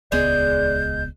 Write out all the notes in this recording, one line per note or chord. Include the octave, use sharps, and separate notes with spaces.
D#1 C#2 G#3 B3 D5 G6